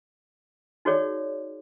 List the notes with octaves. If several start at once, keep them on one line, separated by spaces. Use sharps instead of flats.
D#4 F#4 G#4 C#5 D5